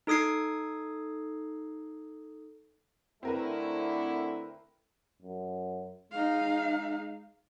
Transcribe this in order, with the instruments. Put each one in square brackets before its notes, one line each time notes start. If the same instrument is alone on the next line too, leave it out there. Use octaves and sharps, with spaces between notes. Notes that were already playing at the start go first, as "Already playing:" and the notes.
[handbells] D#4 A4 D#6 G#6 C7
[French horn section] D3 A3 E4 [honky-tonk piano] C4 A#4 B4
[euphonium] F#2
[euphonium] G#3 [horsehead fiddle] D#4 F5